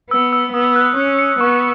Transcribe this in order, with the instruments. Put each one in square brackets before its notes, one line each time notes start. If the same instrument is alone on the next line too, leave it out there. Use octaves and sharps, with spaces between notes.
[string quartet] B3 [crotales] E6
[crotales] E6
[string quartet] B3 [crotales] D#6
[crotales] F#6
[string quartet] C#4 [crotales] F#6
[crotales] C#7
[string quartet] B3 [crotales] C#6